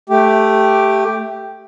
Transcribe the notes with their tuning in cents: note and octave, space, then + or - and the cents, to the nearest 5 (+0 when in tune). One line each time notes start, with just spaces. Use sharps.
A3 +0 G4 +0